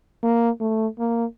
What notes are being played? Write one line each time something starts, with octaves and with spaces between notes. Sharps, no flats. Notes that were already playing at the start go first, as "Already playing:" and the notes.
A#3
A3
A#3